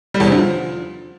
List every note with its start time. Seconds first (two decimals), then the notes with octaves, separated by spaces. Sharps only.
0.14 G3
0.20 E2
0.26 C3
0.32 D3
0.38 F3